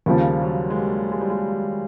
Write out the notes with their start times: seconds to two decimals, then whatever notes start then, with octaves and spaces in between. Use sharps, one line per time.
0.06 D#2 C#3 F3 G3
0.42 F#3
0.70 G#3
0.77 G3
1.12 G#3
1.21 G3
1.30 G#3